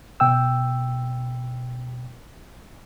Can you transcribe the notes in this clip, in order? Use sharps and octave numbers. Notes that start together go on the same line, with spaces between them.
B2 G5 E6